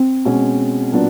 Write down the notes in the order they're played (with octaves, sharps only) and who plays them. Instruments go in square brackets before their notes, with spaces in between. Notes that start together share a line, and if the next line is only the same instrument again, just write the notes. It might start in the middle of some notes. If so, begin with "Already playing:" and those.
Already playing: [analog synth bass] C4
[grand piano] B2 G#3 C#4
A#2 F#3 B3 D4